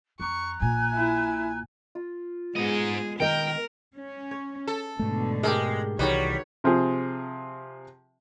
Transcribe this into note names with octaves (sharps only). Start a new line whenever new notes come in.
F2 A#5 C#6 F#6
A#1 A#2 G#5
E4
F4
G#2 G#3 B3 G#4 D#5
D#3 A#4 D#5 G5
C#4
C#5
A4
G#2 B2 D3 A3
G#3 G4 A4 A#4
C2 D#3 E3 G3 F#4 B4 C#5
C3 F3 C4 G#4